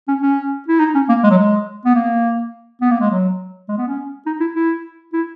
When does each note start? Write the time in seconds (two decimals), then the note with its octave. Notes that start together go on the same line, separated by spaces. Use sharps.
0.08 C#4
0.22 C#4
0.68 E4
0.79 D#4
0.95 C#4
1.09 A#3
1.23 G#3
1.30 F#3
1.38 G#3
1.85 B3
1.95 A#3
2.81 B3
2.91 A#3
3.01 G#3
3.11 F#3
3.69 G#3
3.78 B3
3.87 C#4
4.26 D#4
4.40 E4
4.55 E4
5.13 E4